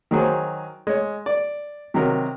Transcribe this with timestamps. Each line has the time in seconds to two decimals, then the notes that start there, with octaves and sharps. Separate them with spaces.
0.11 D#3 F#3 G#4 C5
0.87 G#3 C#5
1.26 D5
1.94 C3 D#3 F#3 A#4